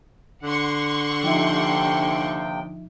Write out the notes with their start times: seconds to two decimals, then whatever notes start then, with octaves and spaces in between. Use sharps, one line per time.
0.43 D3 F#5 C6 C#6 F#6
1.24 D#2 C3 F3 D#4 E5 G5